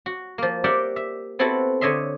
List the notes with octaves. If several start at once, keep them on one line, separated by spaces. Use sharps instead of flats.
F#4
F3 A#3
G4 A#4 D5 E5 F#5 G5
E5
B3 C4 E4 F#4 A4 B4
D3 C#5 D#5 E5 C6